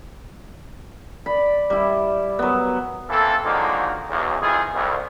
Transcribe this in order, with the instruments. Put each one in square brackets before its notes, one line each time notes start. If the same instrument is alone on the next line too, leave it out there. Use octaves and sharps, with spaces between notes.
[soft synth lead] D5 [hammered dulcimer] B5
[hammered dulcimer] G3 E4
F#3 B3
[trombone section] E3 A#3 C4 A4
D3 D#3 F3 F#3 G#3 A#3
B1 E2
F2 D#3 E4 F4 G#4
C2 F2